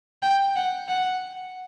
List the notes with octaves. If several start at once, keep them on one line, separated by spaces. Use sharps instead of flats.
G5
F#5
F#5